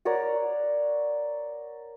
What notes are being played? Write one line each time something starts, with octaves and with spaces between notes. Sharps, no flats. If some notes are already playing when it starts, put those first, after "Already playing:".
A#4 C#5 D5 F#5